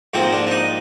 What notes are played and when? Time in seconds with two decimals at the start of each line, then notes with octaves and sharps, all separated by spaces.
0.14 G#2 F3 A#3 C4
0.33 D4
0.47 D4
0.51 D#4